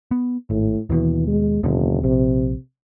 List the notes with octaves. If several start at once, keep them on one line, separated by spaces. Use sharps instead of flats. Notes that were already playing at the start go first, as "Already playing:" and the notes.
B3
G#1 A2
D#2 B2 E3
G#3
F#1 D#2 B2 D3
A#1 C3